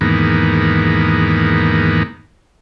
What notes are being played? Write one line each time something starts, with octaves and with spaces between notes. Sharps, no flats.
E2 G#2 D#3 A#3 B3